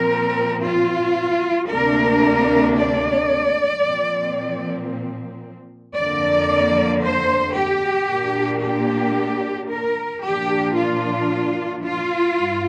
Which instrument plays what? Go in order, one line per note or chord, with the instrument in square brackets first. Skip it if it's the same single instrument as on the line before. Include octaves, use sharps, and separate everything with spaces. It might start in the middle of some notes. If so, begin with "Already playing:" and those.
Already playing: [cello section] A#2 F3 C4 A#4
F4
D2 C3 A#3 D4 A#4
D5
A#2 F3 C4
F2 D3 A#3 D5
C5
G4
A#2 A#3 D4
G4
A#4
A#2 F3 A#3 D4 G4
F4
F4
G2